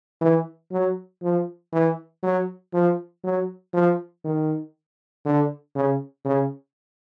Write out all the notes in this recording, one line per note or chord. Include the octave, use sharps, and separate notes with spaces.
E3
F#3
F3
E3
F#3
F3
F#3
F3
D#3
D3
C#3
C#3